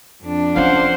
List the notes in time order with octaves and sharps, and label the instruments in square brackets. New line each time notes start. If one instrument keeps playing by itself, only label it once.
[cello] F2 D4
[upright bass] F3 C#4 [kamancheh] C5 F#5 [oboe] F5